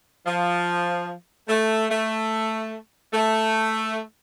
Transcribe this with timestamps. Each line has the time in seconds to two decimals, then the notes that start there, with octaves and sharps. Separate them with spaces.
0.26 F3
1.49 A3
1.90 A3
3.13 A3